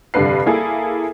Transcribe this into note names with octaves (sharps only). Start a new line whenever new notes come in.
F1 G2 D3 B4 C7
A#3 E4 G#4 A4